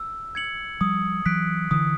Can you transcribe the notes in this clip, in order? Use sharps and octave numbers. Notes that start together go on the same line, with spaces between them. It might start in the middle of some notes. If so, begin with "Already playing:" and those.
Already playing: E6
G#6 C#7 F#7
F3 G3 D#6
E3 F#3 F#6 B6 D7
D3 E3 D#6